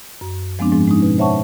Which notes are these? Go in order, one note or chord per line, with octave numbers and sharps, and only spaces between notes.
F#2
F3 G#3 B3 C4 D4
G#2 F3 G#3
G#3 C#4 D#4
B2
C5 C#5 E5 F#5 A5 C#6